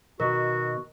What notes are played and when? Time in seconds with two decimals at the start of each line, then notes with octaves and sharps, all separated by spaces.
0.20 B2 D#3 F#4 A#4 B4